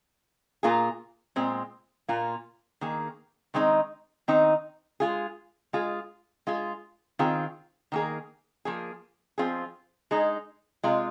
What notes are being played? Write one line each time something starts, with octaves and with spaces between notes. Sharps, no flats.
A#2 A#3 F4 G#4
A#2 G#3 C4
A#2 A#3 F4
D#3 A#3 G#4
D#3 G#3 C4 D#4
D#3 C4 D#4
G#3 F4 G#4
G#3 F4 G#4
G#3 F4 G#4
D#3 C4 F4 G#4
D#3 A#3 G#4
F3 A#3 G#4
F3 C4 F4 G#4
G#3 D#4 G#4
C3 G#3 F4